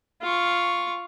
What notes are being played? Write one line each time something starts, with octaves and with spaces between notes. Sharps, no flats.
F4 C#6